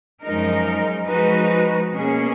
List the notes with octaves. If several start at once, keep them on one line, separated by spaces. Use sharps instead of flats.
F#2 F3 G#3 D#4 A#4
F3 G#3 D#4 F#4 B4
B2 A#3 C#4 G#4